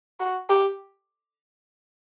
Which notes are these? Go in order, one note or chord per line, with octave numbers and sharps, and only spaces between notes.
F#4
G4